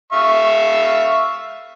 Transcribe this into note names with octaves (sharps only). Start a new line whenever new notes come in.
E5 F5 C#6